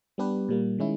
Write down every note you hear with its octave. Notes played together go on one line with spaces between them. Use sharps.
G3 B3 D4 G4 B4
A#2 G3 A#3
D#3 G#3 C#4 E4